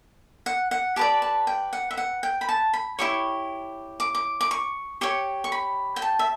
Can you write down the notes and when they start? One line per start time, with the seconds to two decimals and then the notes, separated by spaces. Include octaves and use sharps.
0.46 F#5
0.71 F#5
0.96 G4 B4 D5 A5
1.22 A5
1.47 G5
1.73 F#5
1.91 E5
1.97 F#5
2.23 G5
2.41 B5
2.49 A5
2.73 B5
2.99 E4 G4 C#5 C#6
4.00 D6
4.15 D6
4.41 D6
4.51 C#6
5.01 G4 C#5 C#6
5.44 C#6
5.52 B5
5.96 G5
6.02 A5
6.19 E5